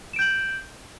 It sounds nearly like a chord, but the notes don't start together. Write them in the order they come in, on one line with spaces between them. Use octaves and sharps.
E7 D7 G6 F#7